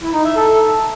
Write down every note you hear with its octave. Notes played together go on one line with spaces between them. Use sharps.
E4
D#4
E5
A4